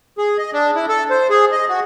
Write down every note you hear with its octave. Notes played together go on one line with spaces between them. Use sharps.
G#4
D#5
D4
E4
A4
C5
G#4
D#5
F#4